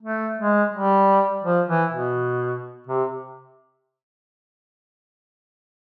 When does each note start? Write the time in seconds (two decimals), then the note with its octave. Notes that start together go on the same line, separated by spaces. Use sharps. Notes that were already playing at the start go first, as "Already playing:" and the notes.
0.02 A3
0.38 G#3
0.73 G3
1.44 F3
1.68 E3
1.92 B2
2.87 C3